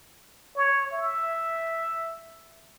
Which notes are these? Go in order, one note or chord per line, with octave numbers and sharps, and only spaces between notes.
C#5
E5